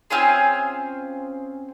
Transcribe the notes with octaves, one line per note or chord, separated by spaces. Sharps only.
C4 C#4 F4 G#4